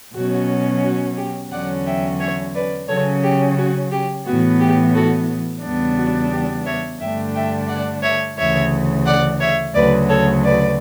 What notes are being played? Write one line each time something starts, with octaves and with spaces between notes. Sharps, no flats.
B2 F#3 C#4 F#4
F#4
G4
E2 D3 F#3 C#4 D5 F#5
E5 G5
C#5 E5
B4 D5
C#3 F#3 C#4 A4 C#5
G4
F#4
G4
A2 E3 B3 F#4
G4
F#4 A4
E2 C#3 G3 B3 D4
F#4
G4
C#5 E5
G2 D3 A3 D4 E5 G5
E5 G5
D5 F#5
C#5 E5
D2 C#3 E3 C#5 E5
D5 F#5
C#5 E5
D2 C#3 F#3 B4 D5
A4 C#5
B4 D5